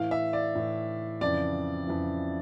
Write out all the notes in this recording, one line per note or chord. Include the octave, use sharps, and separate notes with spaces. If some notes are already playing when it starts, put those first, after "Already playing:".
Already playing: A2 E3 F5
E5
D5
A2 E3
F2 C#3 E3 D5
F2 C#3 E3